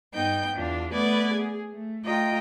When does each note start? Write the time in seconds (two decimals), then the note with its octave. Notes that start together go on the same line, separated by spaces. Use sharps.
0.14 G2 B3 D#4 G5 G6
0.55 E2 D4 F4
0.93 A3 B3 B4 D5 G#6
1.34 G#4
1.73 A3
2.04 A3 F4 D#5 G5 A#5